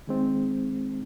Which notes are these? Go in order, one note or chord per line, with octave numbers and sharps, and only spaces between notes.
D#3 G#3 C4 D#4